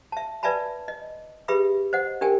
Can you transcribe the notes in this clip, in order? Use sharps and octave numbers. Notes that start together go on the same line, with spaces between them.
E5 A5
B4 D5 E5 G#5 A5 B5
D#5
G4 G#4 B4 E5 B5 D#6
C5 D#5 F#5
D4 G4 A#4 G5 G#5